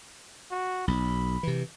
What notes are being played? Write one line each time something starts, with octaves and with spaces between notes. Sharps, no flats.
F#4
B1 B5
C3 E3